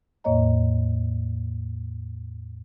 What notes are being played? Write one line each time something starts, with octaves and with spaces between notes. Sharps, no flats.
E2 A2 A#3 C#5 D#5 A#5